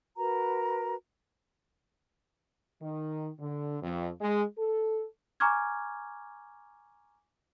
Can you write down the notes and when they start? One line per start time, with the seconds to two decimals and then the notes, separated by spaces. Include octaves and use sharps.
0.18 F#4 A#4 B4 A#5
2.82 D#3
3.39 D3
3.83 F2
4.21 G#3
4.58 A4
5.40 G#5 A#5 C#6 D6 F6 G#6